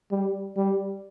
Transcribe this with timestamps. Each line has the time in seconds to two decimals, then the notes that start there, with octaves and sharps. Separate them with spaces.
0.11 G3
0.57 G3